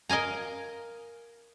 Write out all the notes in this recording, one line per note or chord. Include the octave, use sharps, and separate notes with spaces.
A#4 D#5 F5 G#5 A#5